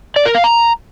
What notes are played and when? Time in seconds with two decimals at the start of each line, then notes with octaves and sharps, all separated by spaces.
0.16 D5
0.25 A#4
0.35 F5
0.44 A#5